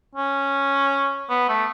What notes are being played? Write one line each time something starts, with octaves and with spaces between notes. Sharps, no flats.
C#4
B3
A3